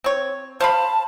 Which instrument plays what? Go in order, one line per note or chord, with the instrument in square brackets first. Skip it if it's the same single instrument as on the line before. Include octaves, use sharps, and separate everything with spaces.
[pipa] C4 C#5
[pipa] C5 F5 B5 [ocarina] A5